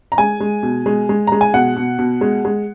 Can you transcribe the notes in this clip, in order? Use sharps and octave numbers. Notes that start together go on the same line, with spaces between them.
A#5
G#3 G#5
G#3
B2
G#3
G#3
G#3 A#5
G#5
B2 F#5
B2
B2
G#3
G#3